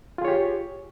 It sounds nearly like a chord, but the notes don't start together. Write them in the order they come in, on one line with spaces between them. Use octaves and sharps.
F4 G#4 C#5 G4